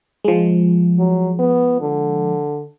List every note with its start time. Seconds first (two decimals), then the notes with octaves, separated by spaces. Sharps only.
0.24 F3 G#3
0.99 F#3
1.39 B3
1.81 D3